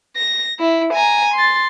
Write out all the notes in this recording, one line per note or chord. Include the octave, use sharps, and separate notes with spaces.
A#6
E4
G#5 A#5
C6 A6